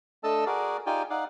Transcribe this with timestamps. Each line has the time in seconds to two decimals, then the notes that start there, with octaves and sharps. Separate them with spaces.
0.24 A3 D4 A4 D#5 A5 E6
0.46 F#4 G#4 A#4 D5
0.86 D#4 F4 G4 D5 G5 G#5
1.10 D#4 D5 F5 F#5